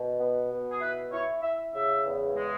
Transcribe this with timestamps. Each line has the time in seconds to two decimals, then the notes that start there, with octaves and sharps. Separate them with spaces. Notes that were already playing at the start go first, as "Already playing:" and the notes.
Already playing: B2
0.20 B3
0.50 B2
0.71 G#4
0.81 E4 B4
1.12 E4 C#5
1.42 E4 E5
1.73 C#3 E5
2.04 E2
2.36 G#3